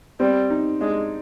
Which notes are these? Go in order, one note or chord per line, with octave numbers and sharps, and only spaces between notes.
G3 C4
D#4
G#3 D4